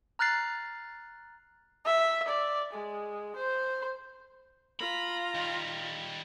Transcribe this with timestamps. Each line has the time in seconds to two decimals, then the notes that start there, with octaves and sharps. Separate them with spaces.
0.19 A#5 F6 F#6 A6 C7
1.86 E5
2.28 D5
2.74 G#3
3.36 C5
4.80 F4 A#5 B5
5.35 D#3 G3